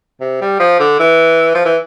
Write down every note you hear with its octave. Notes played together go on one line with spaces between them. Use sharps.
C3
G3
F3
D3
E3
F3
E3